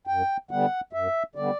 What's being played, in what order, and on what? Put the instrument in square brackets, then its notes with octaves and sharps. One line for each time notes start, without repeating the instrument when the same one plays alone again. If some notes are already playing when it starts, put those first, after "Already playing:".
[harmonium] F#2 G5
D3 G3 B3 F#5
F#2 E5
D3 G3 B3 D5